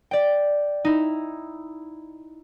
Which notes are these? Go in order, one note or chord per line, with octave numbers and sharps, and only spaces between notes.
D5 G5
D#4 E4